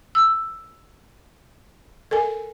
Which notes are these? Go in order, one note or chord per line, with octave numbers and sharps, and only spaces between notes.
E6
A4 A#4 G#5